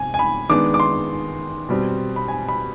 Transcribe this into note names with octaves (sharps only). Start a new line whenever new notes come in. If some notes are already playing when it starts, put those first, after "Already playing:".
Already playing: C3 G#5
G#5
B5
D#3 G#3 B3 D4 D6
D6
C6
B2 G3 C4
B5
G#5
B5